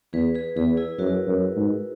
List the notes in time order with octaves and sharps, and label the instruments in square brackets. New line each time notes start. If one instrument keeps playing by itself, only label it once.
[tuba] E2 [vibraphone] G#4 B4
[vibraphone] G#4 B4
[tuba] E2 [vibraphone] G#4 B4
[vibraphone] E4 G#4
[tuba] F#2 [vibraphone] F#4 A#4
[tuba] F#2
G#2